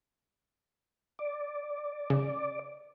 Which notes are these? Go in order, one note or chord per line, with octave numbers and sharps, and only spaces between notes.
D5
C#3